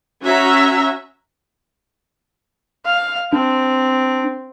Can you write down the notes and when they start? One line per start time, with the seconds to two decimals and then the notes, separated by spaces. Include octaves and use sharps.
0.23 C#4 F#4 E5 A#5
2.86 F5
3.33 C4 D4